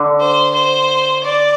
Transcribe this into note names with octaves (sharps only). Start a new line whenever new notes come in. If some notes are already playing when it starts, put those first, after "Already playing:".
Already playing: D3
C5
C5
D5